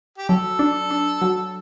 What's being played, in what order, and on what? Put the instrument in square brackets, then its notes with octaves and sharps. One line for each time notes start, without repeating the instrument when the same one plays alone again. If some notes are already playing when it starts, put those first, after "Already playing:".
[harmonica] G4
[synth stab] F#3 [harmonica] A4
[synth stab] D4
D4
F#3